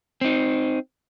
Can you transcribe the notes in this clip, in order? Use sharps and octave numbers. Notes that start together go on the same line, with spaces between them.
C4 D#4